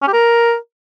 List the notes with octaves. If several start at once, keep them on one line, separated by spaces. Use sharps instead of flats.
C#4
G4
A#4